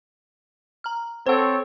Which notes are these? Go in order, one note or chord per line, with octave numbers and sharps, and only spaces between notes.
A#5 F6
C4 A4 C5 C#5 F#5